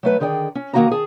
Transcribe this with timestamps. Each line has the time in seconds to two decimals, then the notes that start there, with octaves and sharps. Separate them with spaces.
0.03 F#3 A3 B4
0.20 D3 D#3 G#4 D5 G5
0.55 C#4
0.73 D#3 A3 A#3 F#4 F5 A#5
0.90 D#3 G#4 A5